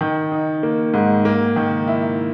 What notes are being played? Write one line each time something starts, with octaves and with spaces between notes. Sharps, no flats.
D#3
D#4
A#3
G#2
A#3
D#3
E4